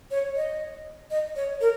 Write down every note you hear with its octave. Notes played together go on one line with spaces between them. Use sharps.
C#5
D#5
D#5
C#5
A#4